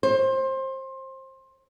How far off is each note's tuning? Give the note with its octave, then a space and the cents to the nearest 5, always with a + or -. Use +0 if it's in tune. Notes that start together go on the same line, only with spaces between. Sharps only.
C5 +25